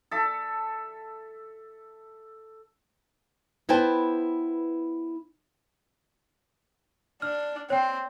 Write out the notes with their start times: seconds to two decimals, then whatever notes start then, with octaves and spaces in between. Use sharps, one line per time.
0.11 A4 E5
3.69 B3 E4 B4 C5 G5 A5
7.22 D4 F6
7.70 C4 C#5 G5